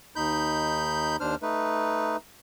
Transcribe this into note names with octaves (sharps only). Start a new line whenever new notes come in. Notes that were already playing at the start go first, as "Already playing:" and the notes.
D#2 D#4 B5 G6
D#2 D4 C5 F6
A3 D#4 B4